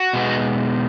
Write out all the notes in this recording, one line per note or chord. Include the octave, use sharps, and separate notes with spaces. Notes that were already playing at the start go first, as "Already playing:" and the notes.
Already playing: F#4
B2 G#3 B3 D#4